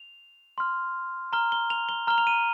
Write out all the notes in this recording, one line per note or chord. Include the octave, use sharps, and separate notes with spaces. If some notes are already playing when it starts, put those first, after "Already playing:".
Already playing: F7
C6 F6
A#5 F6 G7
G7
F7
G7
A#5 F6 G7
F7
D#7